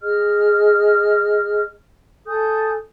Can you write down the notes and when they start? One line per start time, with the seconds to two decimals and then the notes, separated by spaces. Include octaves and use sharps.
0.02 G#4 D#5 F6
2.27 A4 G#5 D#6 G6